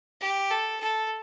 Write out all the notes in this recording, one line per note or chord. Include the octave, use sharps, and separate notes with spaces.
G4
A4
A4